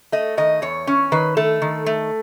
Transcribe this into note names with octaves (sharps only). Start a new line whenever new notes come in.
A3 D#5
D#3 D#5
E2 C#5
C#4
D#3 B4
A3 A4
D#3
A3